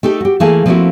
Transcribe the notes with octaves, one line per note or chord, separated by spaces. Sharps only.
A3 D#4 G4 A4
F#4 G4
E3 A3 A#3 G#4 F5 A5
F3 A3 A#3 C4 E4 F#4